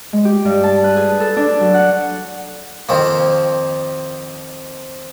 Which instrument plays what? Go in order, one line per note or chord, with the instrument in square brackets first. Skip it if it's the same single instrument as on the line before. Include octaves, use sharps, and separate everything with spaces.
[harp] G#3
G4
G2
A5
B4
G#4
A4
D4
F#3
F#5
[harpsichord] F2 D#3 F3 A#3